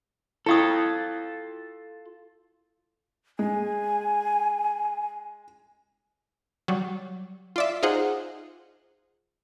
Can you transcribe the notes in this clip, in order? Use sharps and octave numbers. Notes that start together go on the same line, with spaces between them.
E4 F4 A4 C#6 D#6
G#3 G#5
F#3 G3
F4 D5 E5
D#4 F4 G#4 C5 F#5